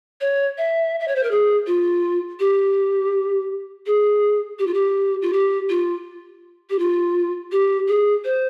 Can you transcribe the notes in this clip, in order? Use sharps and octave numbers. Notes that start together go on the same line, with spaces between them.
C#5
E5
E5
C#5
C5
A#4
G#4
F4
G4
G#4
G4
F4
G4
F4
G4
F4
G4
F4
G4
G#4
C5